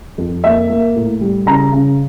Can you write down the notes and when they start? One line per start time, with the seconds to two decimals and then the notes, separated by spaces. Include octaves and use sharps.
0.18 F2
0.44 A#3 E5
0.70 A#3
0.96 A2
1.21 G3
1.46 C#3 A#5
1.72 C#3